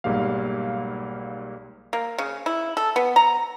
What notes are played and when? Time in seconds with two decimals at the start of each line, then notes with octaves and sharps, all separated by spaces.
0.04 B1 G#2 G3 A#3 F5
1.93 A#3
2.18 C#3
2.46 E4
2.77 A4
2.96 B3
3.16 A#5